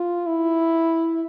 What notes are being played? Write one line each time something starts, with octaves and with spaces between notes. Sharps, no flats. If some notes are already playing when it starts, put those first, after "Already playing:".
Already playing: F4
E4